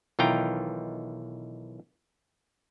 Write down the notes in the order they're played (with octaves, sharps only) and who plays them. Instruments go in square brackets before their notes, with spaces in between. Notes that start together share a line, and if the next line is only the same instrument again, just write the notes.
[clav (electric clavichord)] B1 D#3 E3 F4 G5 A#5